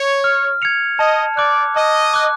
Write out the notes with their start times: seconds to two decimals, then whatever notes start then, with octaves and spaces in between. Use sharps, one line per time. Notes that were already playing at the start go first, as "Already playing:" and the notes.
Already playing: C#5
0.24 F6
0.62 G#6 C#7 F7
0.99 D#5 A5
1.37 D5 D6 F#6
1.76 D#5 A5
2.14 D6 F#6